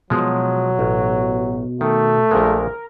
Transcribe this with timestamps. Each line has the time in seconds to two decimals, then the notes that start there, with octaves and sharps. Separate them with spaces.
0.10 B2 F3 F#3 G#3
0.79 A1
1.81 D#3 A3
2.31 A#1 A#2 G#3 A#4